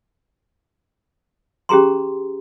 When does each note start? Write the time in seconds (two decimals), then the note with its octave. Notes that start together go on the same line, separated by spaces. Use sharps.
1.69 C#4 G4 G#4 A#5 C6